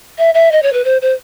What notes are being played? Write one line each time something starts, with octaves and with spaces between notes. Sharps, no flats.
E5
E5
D#5
C#5
B4
C5
C5